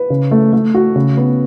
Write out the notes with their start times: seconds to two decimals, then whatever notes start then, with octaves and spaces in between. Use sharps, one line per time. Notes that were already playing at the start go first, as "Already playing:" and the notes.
Already playing: B4
0.10 C#3
0.31 A3
0.53 A3
0.74 F#4
0.96 C#3
1.17 B3